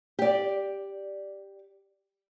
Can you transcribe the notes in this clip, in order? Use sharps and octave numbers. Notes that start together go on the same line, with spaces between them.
G4 D5